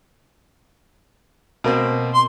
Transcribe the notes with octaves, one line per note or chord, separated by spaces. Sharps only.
B2 A#3 C4
C6